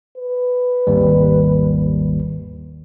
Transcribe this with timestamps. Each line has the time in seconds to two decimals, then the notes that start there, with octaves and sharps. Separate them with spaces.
0.17 B4
0.87 G#1 D#2 G3